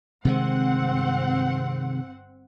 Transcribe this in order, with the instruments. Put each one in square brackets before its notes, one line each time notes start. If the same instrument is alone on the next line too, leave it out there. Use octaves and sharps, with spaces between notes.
[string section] G1 C4 F#5 [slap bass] C3 D#3 G#3